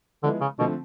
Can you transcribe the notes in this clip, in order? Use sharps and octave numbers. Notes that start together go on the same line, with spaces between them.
D3 F3 G#3 B3 E4
C#3
B2 D3 F3 A3 C4